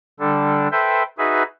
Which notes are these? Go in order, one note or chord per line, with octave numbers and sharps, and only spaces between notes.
D3 G3 D4 A4
A4 B4 C5 E5 G5
D#4 F#4 G#4 B4 E5